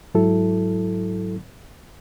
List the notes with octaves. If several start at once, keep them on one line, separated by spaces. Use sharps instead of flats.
G#2 F#3 E4 A4